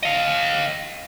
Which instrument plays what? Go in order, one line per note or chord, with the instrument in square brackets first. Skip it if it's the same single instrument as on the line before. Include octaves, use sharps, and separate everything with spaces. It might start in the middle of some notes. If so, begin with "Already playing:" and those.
[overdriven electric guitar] D#5 F5